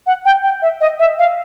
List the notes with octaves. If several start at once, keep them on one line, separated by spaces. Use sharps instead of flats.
F#5
G5
G5
E5
D#5
E5
F5